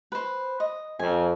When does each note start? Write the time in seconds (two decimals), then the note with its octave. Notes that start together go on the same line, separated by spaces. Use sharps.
0.12 B4 C5
0.60 D#5
0.99 F2 G#5